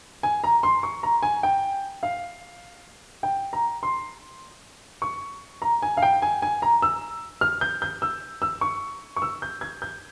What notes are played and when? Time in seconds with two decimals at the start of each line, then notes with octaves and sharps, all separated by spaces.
0.23 G#5
0.44 A#5
0.63 C6
0.83 C#6
1.03 A#5
1.23 G#5
1.43 G5
2.03 F5
3.23 G5
3.53 A#5
3.83 C6
5.02 C#6
5.62 A#5
5.82 G#5
5.97 F5
6.02 G5
6.22 G#5
6.42 G#5
6.62 A#5
6.82 E6
7.41 F6
7.61 G6
7.82 G6
8.02 E6
8.42 E6
8.61 C#6
9.16 C#6
9.22 E6
9.42 G6
9.61 G#6
9.82 G6